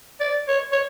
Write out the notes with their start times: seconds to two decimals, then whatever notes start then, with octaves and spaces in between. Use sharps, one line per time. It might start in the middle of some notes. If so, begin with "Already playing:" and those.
0.20 D5
0.48 C#5
0.72 C#5